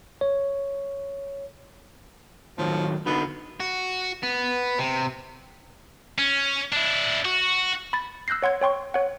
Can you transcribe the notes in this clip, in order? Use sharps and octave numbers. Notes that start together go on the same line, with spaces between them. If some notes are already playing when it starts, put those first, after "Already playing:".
C#5
A2 D#3 F3 F#3
D3 B3 D#4 F#4
F#4
B3
C3
C#4
D4 E4
F#4
B5 A6
E6 F#6 G6 A#6 C7
C#5 F#5 C6 G#6
C#5 G5 C6 C#6
C#5 F#5